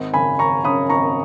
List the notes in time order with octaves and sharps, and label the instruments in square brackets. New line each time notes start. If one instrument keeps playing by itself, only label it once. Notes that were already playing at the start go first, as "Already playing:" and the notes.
Already playing: [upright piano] G#1
F#2 C#3 G#5 B5
G#1 A#5 C#6
F#2 C#3 B5 D#6
G#1 A#5 C#6